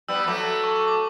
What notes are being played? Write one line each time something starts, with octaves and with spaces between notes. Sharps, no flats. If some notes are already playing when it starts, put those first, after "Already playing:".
G3 B3 E6
F#3 A3 D6
C#6
C#6
D6